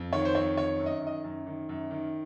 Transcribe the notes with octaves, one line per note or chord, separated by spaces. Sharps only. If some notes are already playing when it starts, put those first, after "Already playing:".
Already playing: F2
D#3 C#5
C5
F2 C#5
D#3 C#5
F#2
D#5
D#3
D#5
F#2
D#3
F#2
D#3